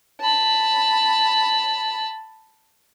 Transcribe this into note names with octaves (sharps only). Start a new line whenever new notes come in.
A5 B5